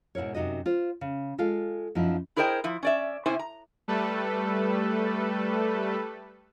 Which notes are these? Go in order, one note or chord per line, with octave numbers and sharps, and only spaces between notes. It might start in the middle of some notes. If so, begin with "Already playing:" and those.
G#2 B2 E4 A#4 C#5
F#2 C3 D#4 F#4 D#5
F4 C5
C#3
G#3 F4 A4 F5
F#2 F3 D#4 E4
E4 G#4 A#4 C5 D#5 G5
F3 E4
C#4 D5 E5
C3 C#4 E4 C5 G#5
A#5
G3 A3 A4 B4